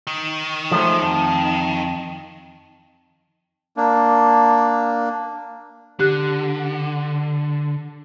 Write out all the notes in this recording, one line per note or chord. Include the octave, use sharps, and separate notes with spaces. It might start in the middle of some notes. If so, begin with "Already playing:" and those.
D#3
F3 G#3 A3
F2
A#3 D4
D3 G4 F#6